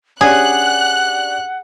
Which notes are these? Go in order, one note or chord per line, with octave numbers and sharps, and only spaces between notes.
C#4 D4 G4 G#4 F#5 F#6